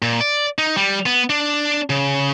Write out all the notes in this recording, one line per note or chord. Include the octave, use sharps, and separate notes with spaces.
A#2
D5
D#4
G3
B3
D4
C#3